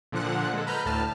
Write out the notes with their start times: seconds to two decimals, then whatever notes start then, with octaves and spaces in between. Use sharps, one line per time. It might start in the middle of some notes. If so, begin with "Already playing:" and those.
0.12 A#2 D3 F3 F#5 F#6
0.53 G#3 A4
0.67 B4 A#5 F6 G6
0.86 D2 A2 A5 F6